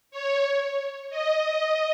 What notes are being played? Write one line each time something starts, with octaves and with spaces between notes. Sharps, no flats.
C#5
D#5